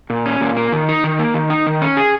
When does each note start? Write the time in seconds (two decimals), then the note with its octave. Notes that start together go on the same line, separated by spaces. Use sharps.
0.10 A#2
0.26 C#4
0.41 A#2
0.57 A#3
0.72 D#3
0.89 D#4
1.04 D#3
1.19 A#3
1.34 D#3
1.50 D#4
1.67 D#3
1.82 C#4
1.97 G#4